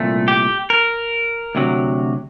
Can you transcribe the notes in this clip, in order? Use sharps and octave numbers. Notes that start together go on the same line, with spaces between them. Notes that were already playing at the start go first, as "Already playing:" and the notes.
Already playing: C2 A#2 A3
G4
A#4
D2 C3 F#3